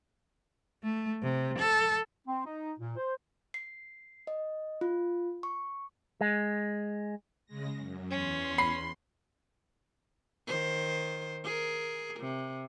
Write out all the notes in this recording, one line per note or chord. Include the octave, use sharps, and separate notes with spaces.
A3
C3
A4
C4
D#4
A#2
C5
C7
D#5
F4
C#6
G#3
C#3 G#3 A#6
F#2
E2 C#4 C6
B5 C7
D#3 C5
G#4 A#4
C3